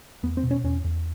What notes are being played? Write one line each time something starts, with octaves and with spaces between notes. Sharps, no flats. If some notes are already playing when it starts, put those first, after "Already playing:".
E2 B3
C4
B2
C#4
E2 C#4
E2